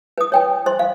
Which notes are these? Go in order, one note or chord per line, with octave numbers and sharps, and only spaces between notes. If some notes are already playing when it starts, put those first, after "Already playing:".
B4 D#6
C#5 G5 G#5
C5 C6
F5